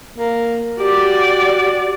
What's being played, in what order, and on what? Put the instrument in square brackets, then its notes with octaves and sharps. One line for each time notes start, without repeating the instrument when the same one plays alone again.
[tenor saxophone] A#3
[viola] F#4 D5 [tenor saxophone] G4